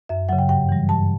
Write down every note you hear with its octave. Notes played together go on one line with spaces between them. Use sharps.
F#2 E5
C#3 F#3 F#5
G5
G2 G5
E3 G3
G2 A5